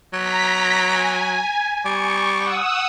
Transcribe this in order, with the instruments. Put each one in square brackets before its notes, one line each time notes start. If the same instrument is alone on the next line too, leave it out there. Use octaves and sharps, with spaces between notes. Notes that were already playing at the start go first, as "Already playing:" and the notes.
[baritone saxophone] F#3 [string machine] A#5 B6
[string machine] G#5
[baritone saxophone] G3 [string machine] C#6
[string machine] F#5 D#6 E6